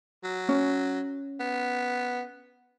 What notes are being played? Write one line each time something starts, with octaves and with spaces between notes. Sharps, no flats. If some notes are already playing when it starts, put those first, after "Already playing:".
F#3
C#4
B3